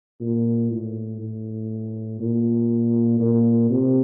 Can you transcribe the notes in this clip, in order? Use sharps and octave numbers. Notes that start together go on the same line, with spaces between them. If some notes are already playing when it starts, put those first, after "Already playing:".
A#2
A2
A2
A#2
A#2
C3